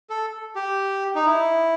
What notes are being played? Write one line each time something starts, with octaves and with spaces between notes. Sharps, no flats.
A4
G4
D#4
E4